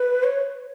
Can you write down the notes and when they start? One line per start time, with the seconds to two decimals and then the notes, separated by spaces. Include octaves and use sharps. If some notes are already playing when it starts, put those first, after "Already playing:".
Already playing: B4
0.24 C#5